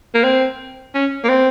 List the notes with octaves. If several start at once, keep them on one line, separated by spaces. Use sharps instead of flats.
A#3
C4
C#4
A#3
C4